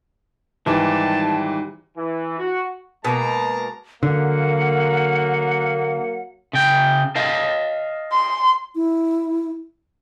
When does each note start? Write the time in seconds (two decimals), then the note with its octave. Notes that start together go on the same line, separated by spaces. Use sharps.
0.66 G#2 D#3 E3 G3 G4 A5
1.97 E3
2.39 F#4
3.05 B2 G#3 A#3 A5 A#5
4.03 D3 F#3 A#3 F#5
6.53 C#3 G5
7.16 D#5 F5 A5
8.11 C6
8.75 E4